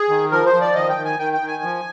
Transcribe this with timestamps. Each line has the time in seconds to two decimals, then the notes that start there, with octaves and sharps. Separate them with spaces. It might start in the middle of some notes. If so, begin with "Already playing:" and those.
Already playing: G#4
0.09 D#3
0.31 F3 A#4
0.46 C5
0.54 F3
0.61 D5
0.75 D#3 D#5
0.89 G5
0.97 D#3
1.05 G#5
1.19 D#3 G5
1.33 G5
1.41 D#3
1.48 G#5
1.63 F3